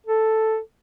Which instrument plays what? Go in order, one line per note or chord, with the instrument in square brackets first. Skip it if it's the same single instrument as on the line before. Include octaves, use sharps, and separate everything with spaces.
[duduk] A4